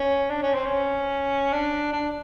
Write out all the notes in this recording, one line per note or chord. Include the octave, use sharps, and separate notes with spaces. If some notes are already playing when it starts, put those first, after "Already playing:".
Already playing: C#4
D4
C#4
C4
C#4
D4
D4